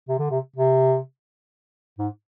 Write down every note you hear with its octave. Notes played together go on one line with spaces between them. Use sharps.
C3
D3
C3
C3
G#2